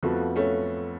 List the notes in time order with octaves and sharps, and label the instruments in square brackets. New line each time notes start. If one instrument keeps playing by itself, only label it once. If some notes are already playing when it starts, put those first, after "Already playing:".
[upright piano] F2 F3 B3 F#4 [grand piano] A3
[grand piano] A3 C#4